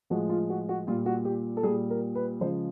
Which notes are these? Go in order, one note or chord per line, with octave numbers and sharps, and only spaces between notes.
A2 F3 G#3 F#4
F4
F#4
F#4
A#2 G3 F4
F#4
G4
A4
A#2 G3 G#4
A#4
B4
C#3 F3 G#3 C5